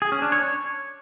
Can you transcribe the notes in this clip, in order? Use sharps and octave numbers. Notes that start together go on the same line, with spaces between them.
G#4
C#4
D4
C#5